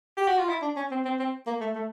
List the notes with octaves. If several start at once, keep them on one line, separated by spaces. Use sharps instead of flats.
G4
F#4
F4
E4
D4
C#4
C4
C4
C4
A#3
A3
A3